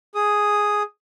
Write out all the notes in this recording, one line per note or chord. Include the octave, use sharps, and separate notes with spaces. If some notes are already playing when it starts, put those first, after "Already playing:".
G#4 D#6